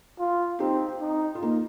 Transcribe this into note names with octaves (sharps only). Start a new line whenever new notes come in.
F4
C4 D#4 G4
D#4
F4
A#3 D#4